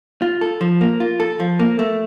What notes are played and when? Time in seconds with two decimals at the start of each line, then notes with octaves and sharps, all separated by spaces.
0.22 F4
0.41 A4
0.61 F3
0.81 A#3
1.00 F4
1.20 A4
1.40 F3
1.59 A#3
1.79 A3